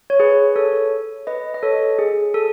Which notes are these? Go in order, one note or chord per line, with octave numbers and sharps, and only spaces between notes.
C#5
G#4 B4
A4 C#5
B4 D#5
D#5
A4 C#5
G#4
A4